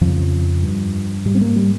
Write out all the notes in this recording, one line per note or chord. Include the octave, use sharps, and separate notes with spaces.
F2 C#3 F3
G2
G#2 G3
C4
A#3
G3